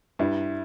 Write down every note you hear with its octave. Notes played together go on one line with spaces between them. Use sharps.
G2 E4